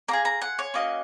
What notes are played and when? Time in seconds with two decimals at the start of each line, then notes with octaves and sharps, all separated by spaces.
0.08 A#3 F4 G#4 A#5
0.25 A#5
0.42 F#5
0.59 C#5
0.74 A#3 C#4 F#4 D#5